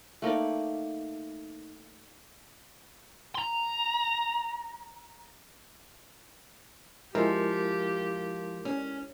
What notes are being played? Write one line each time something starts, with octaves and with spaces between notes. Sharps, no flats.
A3 A#3 D#4 D5
A#5 C6
F3 G#3 E4 G4 A#4
C#4